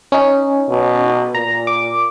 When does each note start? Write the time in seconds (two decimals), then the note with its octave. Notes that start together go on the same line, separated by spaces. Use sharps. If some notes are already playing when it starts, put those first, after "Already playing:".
0.12 C#4 D#4
0.69 B2
1.35 A#2 A#5
1.67 D6